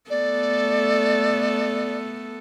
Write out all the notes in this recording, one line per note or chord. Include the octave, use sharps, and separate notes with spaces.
A3 B3 A4 D5